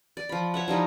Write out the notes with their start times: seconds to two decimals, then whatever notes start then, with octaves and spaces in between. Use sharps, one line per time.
0.17 D5
0.29 F3 B5
0.54 C#5 E5 F#5
0.68 F3 G3 D#4 E4